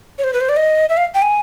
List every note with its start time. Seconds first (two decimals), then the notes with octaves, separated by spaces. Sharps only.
0.18 C#5
0.24 C5
0.33 B4
0.41 C5
0.49 D5
0.57 D#5
0.89 E5
0.97 F5
1.15 G5
1.22 G#5